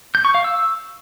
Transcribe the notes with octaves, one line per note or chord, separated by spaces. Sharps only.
G6
C#6
F5
E6